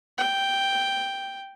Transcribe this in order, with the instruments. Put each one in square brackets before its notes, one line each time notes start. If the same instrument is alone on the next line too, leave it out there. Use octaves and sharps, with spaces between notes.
[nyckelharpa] G5